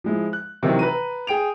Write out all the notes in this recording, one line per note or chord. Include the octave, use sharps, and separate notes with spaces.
F3 G#3 E4
F#6
C3 D#3 E3 F#3
B4 A#5 D#7
G#4 G5 D7 F7